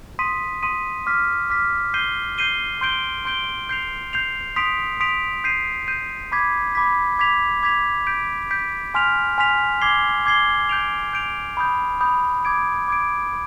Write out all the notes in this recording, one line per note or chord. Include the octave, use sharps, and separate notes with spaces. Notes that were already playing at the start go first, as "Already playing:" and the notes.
C6 D#6 B6 D#7
C6 D#6 B6 D#7
D6 F6 B6
D6 F6 B6
G6 C7 D#7 G7
G6 C7 D#7 G7
C6 G6 D7 G7
C6 G6 D7 G7
G6 C7 F7
G6 C7 F7
C6 D#6 B6 D7 F7
C6 D#6 B6 D7 F7
G6 C7 D#7
G6 C7 D#7
B5 D6 G#6 B6
B5 D6 G#6 B6
D6 G#6 B6 F7
D6 G#6 B6 F7
G6 B6 D7
G6 B6 D7
G#5 C6 F6 B6 F7
G#5 C6 F6 B6 F7
D6 G#6 C7 G7
D6 G#6 C7 G7
G6 D7 F7
G6 D7 F7
B5 D#6 G6
B5 D#6 G6
D6 G#6 D7
D6 G#6 D7